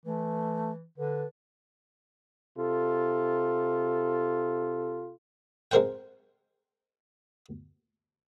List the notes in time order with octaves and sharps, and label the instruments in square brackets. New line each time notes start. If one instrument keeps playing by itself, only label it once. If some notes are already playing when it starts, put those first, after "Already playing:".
[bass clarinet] E3 [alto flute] A3
[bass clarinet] D3 [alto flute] B4
[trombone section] C3 F4 A4
[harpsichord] G#3 C4 A#4 C5 F#5 G5